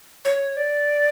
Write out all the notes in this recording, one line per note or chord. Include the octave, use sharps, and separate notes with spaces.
C#5
D5